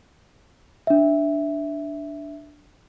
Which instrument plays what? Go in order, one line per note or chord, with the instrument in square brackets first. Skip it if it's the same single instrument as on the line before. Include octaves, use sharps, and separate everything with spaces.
[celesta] D4 E5